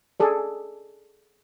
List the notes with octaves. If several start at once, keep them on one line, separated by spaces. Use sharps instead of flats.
G#4 A4 D5